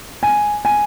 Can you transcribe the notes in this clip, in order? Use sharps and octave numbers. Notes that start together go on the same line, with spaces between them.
G#5
G#5